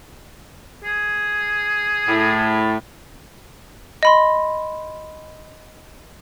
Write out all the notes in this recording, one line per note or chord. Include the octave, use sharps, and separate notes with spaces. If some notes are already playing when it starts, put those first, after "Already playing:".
G#4
A2
D#5 B5 C6